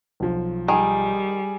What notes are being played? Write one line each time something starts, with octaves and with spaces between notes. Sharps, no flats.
B1 F3
D#3 G3 G#4